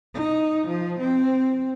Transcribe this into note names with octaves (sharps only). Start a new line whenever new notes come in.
D#4
F3
C4